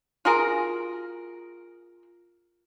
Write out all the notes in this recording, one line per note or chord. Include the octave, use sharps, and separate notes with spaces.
F4 F#4 G#4 A#4